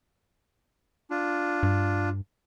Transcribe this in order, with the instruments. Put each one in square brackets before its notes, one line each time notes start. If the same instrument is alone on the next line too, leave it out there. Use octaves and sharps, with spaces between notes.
[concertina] D4 F4
[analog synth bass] G2